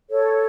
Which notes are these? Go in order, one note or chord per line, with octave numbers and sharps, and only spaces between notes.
A4 C#5